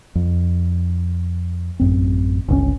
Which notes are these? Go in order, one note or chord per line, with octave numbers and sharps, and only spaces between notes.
F2
A1 F#2 C4
G1 C#2 C3 C#4